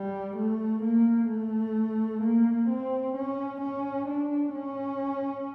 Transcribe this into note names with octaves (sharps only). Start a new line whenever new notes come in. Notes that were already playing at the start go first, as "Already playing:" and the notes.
Already playing: G3
A3
A#3
A3
A#3
C4
C#4
C#4
D4
C#4